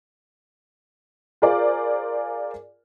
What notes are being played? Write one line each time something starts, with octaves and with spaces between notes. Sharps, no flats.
F4 G#4 A#4 C5 D5